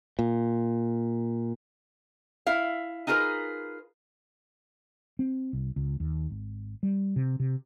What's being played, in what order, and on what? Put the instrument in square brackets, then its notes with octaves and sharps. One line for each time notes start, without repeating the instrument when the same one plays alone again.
[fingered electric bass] A#2
[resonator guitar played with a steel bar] E4 E5 F5
D#4 F4 G#4 A#4 B4
[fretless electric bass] C4
C2
C#2
D#2
G#1
G3
C3
C3